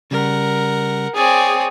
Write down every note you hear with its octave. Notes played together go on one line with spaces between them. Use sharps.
C#3 G3 A#4 F#5
C4 G#4 C#5 D5